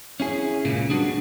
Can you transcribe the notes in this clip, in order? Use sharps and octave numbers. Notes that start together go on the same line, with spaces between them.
C#4 E4 G#4
C#2 A#2 C#3 A#3
G3 B3 D4 F#4 G#4